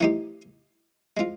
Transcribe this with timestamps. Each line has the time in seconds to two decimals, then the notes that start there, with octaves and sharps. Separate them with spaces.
0.01 E3 A3 C4 D#4 G4
1.17 G#3 C4 F4